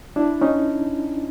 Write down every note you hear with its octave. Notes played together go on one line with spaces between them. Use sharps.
D4 E4
C#4 D#4